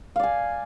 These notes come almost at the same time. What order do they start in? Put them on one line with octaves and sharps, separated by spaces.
F5 D5 G#5